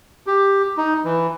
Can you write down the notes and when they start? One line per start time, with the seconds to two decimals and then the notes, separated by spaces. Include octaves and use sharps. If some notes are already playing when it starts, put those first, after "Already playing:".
0.27 G4
0.77 D#4
1.04 E3